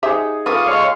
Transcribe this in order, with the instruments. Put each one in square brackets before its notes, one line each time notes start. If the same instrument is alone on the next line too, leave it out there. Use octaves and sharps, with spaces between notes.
[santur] D#4 G#4 F#5 [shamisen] G4 C5 E5
[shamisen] A3 A#3 B4 [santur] F4 [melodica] D5 F5 C#6 [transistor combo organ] D#6
[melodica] G#3 A4 C6 [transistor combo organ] C#5 F5